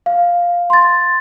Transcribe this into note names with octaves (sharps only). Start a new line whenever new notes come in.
F5
C6 A6